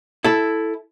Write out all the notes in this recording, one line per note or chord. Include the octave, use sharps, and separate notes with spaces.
E4 A4